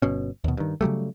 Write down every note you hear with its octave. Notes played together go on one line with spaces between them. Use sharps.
G1 B2 C#4
D#2 B2
G2 D#3
C#3 F#3 G3 A3